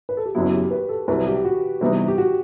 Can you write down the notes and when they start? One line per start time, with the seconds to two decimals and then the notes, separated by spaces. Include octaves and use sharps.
0.09 B4
0.17 A4
0.26 G4
0.35 F#1 F#2 F#3 B3 E4 F#4
0.53 G4
0.71 B4
0.89 A4
1.08 C2 C3 F#3 B4
1.27 G4
1.45 F#4
1.81 C3 E3 G3 B3 D#4
2.08 G4
2.18 F#4